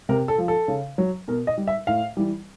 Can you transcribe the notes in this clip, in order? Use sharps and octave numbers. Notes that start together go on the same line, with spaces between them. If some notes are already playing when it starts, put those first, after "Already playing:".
C3 A#4
A4
F3
A4
C#3
F#3
B2 A#4
D#5
G3
E5
A2 F5
E3 G3